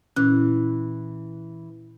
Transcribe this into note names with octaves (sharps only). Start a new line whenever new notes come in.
A#2 E3 C#4 F#6